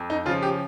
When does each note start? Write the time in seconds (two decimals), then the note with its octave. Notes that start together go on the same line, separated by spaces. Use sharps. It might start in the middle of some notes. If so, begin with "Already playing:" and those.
Already playing: F2
0.10 D#4
0.26 C#3 F4
0.29 F3
0.42 G4